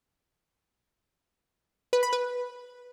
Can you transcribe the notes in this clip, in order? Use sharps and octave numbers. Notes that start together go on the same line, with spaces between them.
B4
B5
B4